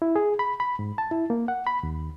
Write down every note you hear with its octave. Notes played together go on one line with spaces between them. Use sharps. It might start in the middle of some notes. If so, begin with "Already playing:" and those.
E4
G#4
B5
B5
G#2
A5
E4
A#3
F#5
B5
D#2